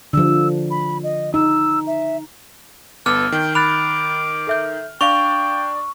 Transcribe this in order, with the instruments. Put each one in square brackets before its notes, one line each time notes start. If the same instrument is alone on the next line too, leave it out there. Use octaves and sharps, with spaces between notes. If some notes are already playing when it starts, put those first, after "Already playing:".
[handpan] D3 F3 [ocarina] E6
[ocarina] B5
D#5
[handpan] D#4 [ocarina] E6
[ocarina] E5
[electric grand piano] G1 B3 [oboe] A4 [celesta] D6 [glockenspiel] F6
[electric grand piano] D#3 [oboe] G5
[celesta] B5 F#6 A6 [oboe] D6 [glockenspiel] F7
[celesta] A4 E5 G6
[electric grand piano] D4 D5 [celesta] F5 F7 [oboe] G5 [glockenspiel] C#6